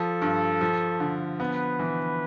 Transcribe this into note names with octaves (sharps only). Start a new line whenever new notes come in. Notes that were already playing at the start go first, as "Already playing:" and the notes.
Already playing: F3 A4
G2
F3
D3
B3 B4
E3